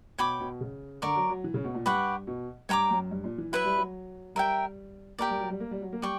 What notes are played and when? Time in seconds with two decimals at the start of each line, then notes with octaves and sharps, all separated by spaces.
0.18 B2 C#5 G5 B5 D6
0.40 B2
0.61 C#3
1.02 D3 A#4 D5 A#5 C#6
1.16 F#3
1.30 F#3
1.44 E3
1.54 C#3
1.64 B2
1.75 A#2
1.86 G2 G4 B4 F#5 C#6
2.27 B2
2.69 G2 C#5 G5 A#5 D6
2.90 F#2
3.11 G2
3.24 A#2
3.38 E3
3.52 F#3 E4 B4 E5
3.65 G3
3.76 F#3
4.35 G3 A#4 E5 G5
5.19 A#3 G4 A#4 D5
5.30 G3
5.40 F#3
5.50 G3
5.60 A#3
5.71 G3
5.82 F#3
5.93 A#3
6.02 G3 D5 G5 C#6